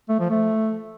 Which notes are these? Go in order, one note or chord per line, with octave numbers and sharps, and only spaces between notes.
A3
F3
A3